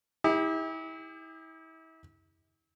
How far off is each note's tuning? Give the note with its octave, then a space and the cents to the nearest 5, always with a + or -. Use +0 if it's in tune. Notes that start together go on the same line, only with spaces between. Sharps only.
E4 -35 G4 +35